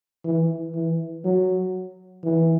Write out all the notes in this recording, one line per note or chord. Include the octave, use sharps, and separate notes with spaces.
E3
E3
F#3
E3